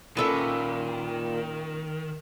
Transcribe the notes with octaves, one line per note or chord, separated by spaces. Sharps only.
A#2 D#3 C#4 A4 B4 D#5 E5